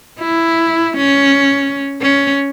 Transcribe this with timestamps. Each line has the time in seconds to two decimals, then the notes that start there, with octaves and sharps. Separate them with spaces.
0.20 E4
0.97 C#4
2.02 C#4